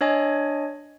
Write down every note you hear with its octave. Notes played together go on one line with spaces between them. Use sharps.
D4 C#5 D#5 G#5